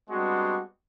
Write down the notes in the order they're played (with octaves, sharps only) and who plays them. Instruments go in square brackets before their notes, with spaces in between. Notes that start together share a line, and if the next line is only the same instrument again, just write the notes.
[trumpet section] G3 G#3 B3 C4 D4 F#4